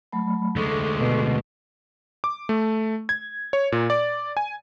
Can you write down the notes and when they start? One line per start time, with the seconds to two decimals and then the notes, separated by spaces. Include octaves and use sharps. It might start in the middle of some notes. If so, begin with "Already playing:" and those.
0.13 F#3 A3 B5
0.56 D2 G#3 A4 C#6 D6
0.99 B2
2.24 D6
2.49 A3
3.09 G#6
3.53 C#5
3.72 A#2
3.90 D5
4.37 G#5